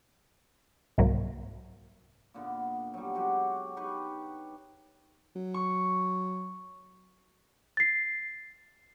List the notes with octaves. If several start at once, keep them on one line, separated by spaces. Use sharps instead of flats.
C2 G#2 F#3 A#3
A#2 D3 B3
F#3 G3
F#3 G#3 F#4 G4
D#4 G4 B4 C#6
F#3
C#6
A6 C7